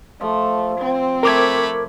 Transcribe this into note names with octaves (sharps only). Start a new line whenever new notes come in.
F3 A3
C4
A3 A#4 B5 D6 G#6